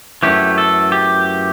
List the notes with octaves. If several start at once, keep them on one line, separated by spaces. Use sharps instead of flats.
F#2 E3 A3 G4
A4
G4